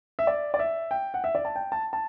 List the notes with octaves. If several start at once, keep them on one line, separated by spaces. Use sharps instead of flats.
E5
D5
D5
E5
G5
F#5
E5
D5
A5
G5
A5
A5